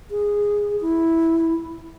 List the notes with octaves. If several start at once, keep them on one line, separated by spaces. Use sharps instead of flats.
G#4
E4